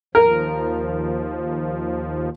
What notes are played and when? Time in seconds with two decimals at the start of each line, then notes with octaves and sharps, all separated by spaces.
0.15 D#2 F3 A#4